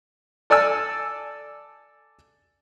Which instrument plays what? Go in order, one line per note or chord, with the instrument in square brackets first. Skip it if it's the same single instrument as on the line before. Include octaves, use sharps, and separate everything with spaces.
[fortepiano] A4 D5 G#5 A5 E6